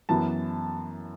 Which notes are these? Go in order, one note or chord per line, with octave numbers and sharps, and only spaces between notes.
F#2 E3 B3 A5